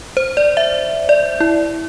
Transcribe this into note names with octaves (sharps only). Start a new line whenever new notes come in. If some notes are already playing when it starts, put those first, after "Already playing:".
C5
D5
E5
D5
E4